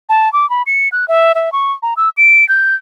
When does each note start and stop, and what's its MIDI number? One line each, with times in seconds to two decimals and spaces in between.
0.09 0.31 81
0.33 0.48 86
0.50 0.62 83
0.66 0.88 97
0.92 1.05 90
1.08 1.32 76
1.35 1.52 76
1.52 1.72 85
1.82 1.94 82
1.97 2.09 88
2.17 2.47 98
2.49 2.75 91